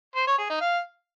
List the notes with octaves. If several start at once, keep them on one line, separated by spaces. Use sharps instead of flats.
C5
C#5
G#4
D#4
F5